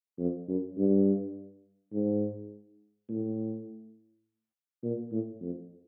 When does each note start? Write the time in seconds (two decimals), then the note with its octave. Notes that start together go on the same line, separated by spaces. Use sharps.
0.19 F2
0.48 F#2
0.77 G2
1.93 G#2
3.09 A2
4.83 A#2
5.12 A2
5.41 F2